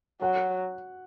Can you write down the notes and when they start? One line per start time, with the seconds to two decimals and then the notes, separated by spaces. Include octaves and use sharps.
0.21 F#3 F#5